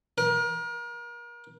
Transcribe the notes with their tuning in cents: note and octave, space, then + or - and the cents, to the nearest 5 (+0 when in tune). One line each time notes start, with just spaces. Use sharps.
A#4 +35